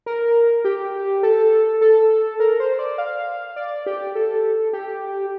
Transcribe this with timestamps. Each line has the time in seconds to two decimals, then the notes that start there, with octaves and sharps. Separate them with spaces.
0.06 A#4
0.65 G4
1.23 A4
1.81 A4
2.40 A#4
2.60 C5
2.79 D5
2.98 F5
3.56 D5
3.86 G4
4.15 A4
4.73 G4